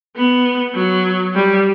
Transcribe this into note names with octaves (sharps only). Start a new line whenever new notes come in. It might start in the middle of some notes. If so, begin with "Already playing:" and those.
B3
F#3
G3